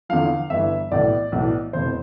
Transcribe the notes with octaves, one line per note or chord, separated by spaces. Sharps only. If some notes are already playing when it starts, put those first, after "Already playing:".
E2 D3 F3 F5
G1 G2 E3 E5
B1 A2 E3 D5
B1 A2 E3
F1 E2 B2 C5